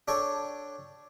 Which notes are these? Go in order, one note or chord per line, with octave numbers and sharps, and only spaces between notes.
D4 A4 C#5 G5 C#6